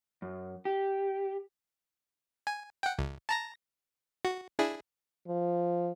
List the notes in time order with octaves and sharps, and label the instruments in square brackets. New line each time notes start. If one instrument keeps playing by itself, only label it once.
[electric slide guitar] F#2
G4
[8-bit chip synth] G#5
F#5 G5
C#2
A5 A#5 A#6
F#4
D4 E4 G#4
[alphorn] F3